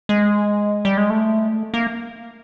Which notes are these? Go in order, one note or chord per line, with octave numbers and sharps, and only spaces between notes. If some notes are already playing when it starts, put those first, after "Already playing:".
G#3
G3
G#3
A3
A#3